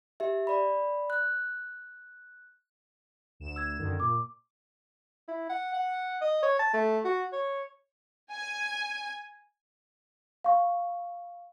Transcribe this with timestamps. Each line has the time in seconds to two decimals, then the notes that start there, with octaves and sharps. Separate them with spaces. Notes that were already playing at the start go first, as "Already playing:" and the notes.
0.20 G4 E5
0.47 D5 B5
1.10 F#6
3.40 D2 E7
3.56 E6 G#6
3.79 F#2 D3 D#3
4.00 A#2 D6
5.28 E4
5.49 F#5
5.74 F#5
6.21 D#5
6.43 C#5
6.59 A5
6.74 A3
7.05 F#4
7.33 C#5
8.31 G#5
10.44 F5 C#6